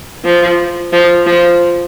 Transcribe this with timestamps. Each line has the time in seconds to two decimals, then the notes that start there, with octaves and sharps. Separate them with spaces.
0.25 F3
0.93 F3
1.27 F3